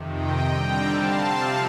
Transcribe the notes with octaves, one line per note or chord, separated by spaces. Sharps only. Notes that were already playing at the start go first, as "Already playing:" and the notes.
Already playing: F2 C3 D#3
D#5 G5
D3 G3 C4 G5 A#5
F5 A5
C3 F3 C4